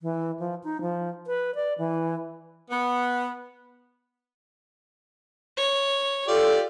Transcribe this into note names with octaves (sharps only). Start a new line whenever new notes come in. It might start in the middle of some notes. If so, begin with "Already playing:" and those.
E3
F3
D#4
F3
B4
D5
E3
B3
C#5
F4 G4 A4 D5